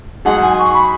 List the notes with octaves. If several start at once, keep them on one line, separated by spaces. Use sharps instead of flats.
G#2 F#3 D#4 G#4 F#5
G#5
C#6
B5